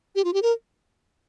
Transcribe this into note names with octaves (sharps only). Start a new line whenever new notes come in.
G4
F4
G4
A#4